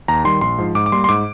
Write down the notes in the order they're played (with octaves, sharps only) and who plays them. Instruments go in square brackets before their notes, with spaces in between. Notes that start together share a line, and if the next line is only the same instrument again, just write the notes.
[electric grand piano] D#2 A#5
D#3 G3 C6
A#1 C6
G#2 F3
G#2 D6
D6
G3 A#3 C6
C6
G#2 D6